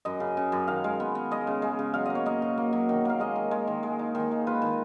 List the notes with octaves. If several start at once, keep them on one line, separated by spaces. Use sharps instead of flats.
F#2 D#5
C#3
C#3
F#2
D#3 F5
G#3
B3
B3
G#3 D#5
C#3
G#3
C#3
F#3 F5
A#3 D#5
C#5
A#3 D#5
B2
A#3
F#3
D#3
A#3 F5
G#3 D#5
D#3
G#3
D#3
G#3
D#4
D#3
G#3
F4 B4
D#3